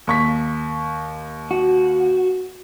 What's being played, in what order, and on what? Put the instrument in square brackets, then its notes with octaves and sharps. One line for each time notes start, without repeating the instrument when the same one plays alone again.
[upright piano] D#2 C#6 B6
[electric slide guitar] F#4